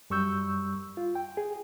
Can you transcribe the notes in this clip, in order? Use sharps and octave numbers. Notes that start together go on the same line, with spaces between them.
F#2 G3 C#6 E6 G6
F4
G5
G#4